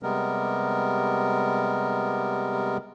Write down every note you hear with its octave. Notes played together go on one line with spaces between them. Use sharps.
C3 G3 G#3 B3 A#4